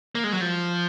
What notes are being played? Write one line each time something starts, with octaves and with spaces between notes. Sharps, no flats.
A#3
G#3
F#3
F3